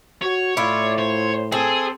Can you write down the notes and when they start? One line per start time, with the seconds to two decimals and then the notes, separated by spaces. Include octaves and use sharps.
0.22 F#4 C#5
0.57 A2 E4 F4 D5
0.99 C5 C#5
1.52 C4 G#4 A4